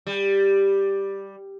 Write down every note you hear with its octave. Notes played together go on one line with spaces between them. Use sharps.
G3